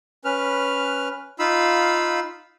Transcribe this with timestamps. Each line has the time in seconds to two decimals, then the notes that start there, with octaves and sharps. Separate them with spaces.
0.25 C#4 B4 F6
1.39 D#4 F4 F5 B5 E6